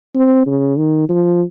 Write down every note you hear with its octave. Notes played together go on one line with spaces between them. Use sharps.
C4
C#3
D#3
F3